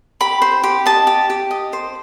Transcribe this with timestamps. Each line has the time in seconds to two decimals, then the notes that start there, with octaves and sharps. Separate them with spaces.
0.20 G4 B5
0.42 C5
0.64 G4
0.86 D#5 A5
1.07 G4
1.30 G4
1.51 D#5
1.73 C5